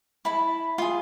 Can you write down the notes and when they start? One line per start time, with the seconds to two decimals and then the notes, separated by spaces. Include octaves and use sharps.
0.25 E4 A5 B5
0.78 F4 G#4